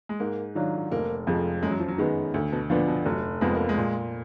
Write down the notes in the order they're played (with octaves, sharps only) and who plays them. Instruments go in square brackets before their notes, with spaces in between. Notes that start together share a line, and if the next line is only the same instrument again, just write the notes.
[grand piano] G#3
[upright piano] G#2 [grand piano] A#3
[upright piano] D#3 F#3 D4 F4
[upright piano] F1 [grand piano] A#3
[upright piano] F2 F3 G#3
[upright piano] F#2 [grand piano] G#3
[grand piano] F#3
F3
F#3
[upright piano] D#3 G#3 B3
D2
[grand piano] B2
[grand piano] A#2 [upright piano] D3 F3 B3 D4
[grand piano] B2
[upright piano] F1 [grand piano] F#3
[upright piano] F2 F3 B3 [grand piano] G#3
[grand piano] A#3
G#3
[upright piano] A#2